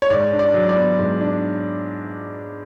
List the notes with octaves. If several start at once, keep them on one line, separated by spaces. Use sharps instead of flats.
C#5
G#2 D5
D4
D5
F#3
D5
B3
G#2
D4